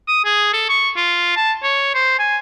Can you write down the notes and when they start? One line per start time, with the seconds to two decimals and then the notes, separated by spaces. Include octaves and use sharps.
0.08 D#6
0.25 G#4
0.53 A4
0.69 C#6
0.96 F4
1.36 A5
1.63 C#5
1.95 C5
2.19 G#5